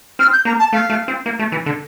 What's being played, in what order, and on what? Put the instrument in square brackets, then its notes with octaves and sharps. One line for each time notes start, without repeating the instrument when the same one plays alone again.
[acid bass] C4 [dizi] F6
[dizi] G6
[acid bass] A#3 [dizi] A#5
[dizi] A5
[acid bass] A3 [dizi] F5
[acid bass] A3
C4
A#3
A3
E3
D3